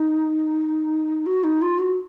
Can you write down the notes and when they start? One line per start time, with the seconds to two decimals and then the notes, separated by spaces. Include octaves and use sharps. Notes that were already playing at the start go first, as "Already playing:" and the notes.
Already playing: D#4
1.26 F#4
1.44 D#4
1.62 F4
1.79 F#4